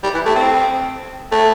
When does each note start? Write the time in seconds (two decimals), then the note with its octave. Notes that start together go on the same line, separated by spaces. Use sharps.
0.03 G3
0.14 E3
0.25 A3
0.36 C4
1.32 A3